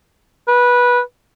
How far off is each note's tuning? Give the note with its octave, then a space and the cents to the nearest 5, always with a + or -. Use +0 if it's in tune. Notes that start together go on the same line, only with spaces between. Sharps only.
B4 -15